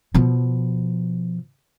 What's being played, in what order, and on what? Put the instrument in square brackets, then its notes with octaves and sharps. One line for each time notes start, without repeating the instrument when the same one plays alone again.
[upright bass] B2 F3